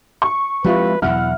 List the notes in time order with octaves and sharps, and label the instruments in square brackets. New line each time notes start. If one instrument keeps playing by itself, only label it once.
[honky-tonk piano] C#6
[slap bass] F3 G#3 C4 [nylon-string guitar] E4 F4 G4 [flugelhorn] B4
[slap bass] E2 B2 F#3 [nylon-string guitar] E4 [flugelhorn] F#5 [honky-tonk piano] F6